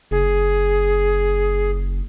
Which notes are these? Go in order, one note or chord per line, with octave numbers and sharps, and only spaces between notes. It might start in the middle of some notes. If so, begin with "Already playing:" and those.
F#1 G#4